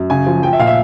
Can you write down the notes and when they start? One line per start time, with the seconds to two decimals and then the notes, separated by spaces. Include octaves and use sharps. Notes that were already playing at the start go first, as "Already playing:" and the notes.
Already playing: F#2
0.10 C#3 G#5
0.27 F3
0.43 F3 G5
0.53 E5
0.59 A#2 F5
0.67 E5